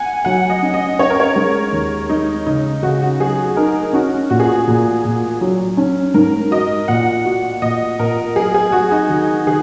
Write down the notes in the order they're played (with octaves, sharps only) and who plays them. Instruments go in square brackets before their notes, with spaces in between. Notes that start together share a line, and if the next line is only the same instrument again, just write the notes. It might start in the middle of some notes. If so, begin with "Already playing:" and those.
Already playing: [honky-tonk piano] F#5 G#5
[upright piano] F#3 [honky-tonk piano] F#5
[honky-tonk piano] D#5
[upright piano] C#4
[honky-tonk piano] D#5
[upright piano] C#4 [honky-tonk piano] C#5
[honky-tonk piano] A#4
C#5
[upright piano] G#3
D#2
[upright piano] G#3 [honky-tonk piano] D#4
[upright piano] C#3 [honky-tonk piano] D#4
[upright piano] C#3 [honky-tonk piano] F#4
[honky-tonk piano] F#4
[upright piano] F#3 [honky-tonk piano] G#4
[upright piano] D#4 [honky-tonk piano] A#4
[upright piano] C#4 [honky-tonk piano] F#4
[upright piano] A#2 [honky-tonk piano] F#4
[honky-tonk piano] G#4
F#4
[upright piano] A#2
A#2
F#3
C#4
[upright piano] G#2 [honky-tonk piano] A#4
[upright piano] F#4 [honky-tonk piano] D#5
[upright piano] A#2 [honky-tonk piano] F#5
[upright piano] F#4
[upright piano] A#2 [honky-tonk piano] D#5
[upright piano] A#2 [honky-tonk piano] A#4
[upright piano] F#3 [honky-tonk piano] G#4
[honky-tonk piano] G#4
[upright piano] F#3 [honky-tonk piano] F#4
[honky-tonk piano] D#4
[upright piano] D#3
[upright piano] D#3 [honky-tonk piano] G#4